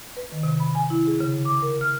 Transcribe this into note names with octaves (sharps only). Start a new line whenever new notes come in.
B4
D#3
C3
B5
G#5
E4
G#4
C#3
D6
A#4
F6